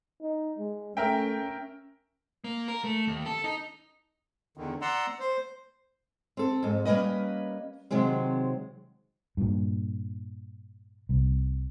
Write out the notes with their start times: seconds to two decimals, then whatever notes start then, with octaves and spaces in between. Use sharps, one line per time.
0.21 D#4
0.58 G#3
0.97 A3 C#4 A#4 E5 G5
2.44 A#3
2.68 A#4
2.84 A3
3.07 D#2
3.26 A4
3.44 D#4
4.57 E2 D3 D#3
4.82 D5 F#5 A#5 C6 E6
5.20 C5
6.37 C4 A4
6.63 F2 G#2
6.85 G3 A#3 C#4 A#4 B4 D#5
7.91 C3 D#3 F#3 G#3 C4
9.37 G2 A#2
11.09 C2